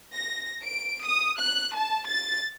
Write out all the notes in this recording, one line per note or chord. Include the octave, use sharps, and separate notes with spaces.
A#6
D7
D#6
F#6
A5
A6